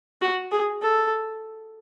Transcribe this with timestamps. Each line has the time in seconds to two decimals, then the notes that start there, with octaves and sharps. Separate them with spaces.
0.21 F#4
0.52 G#4
0.82 A4